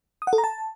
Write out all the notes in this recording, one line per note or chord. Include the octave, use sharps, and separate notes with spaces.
D#6
F#5
A4
A#5
A5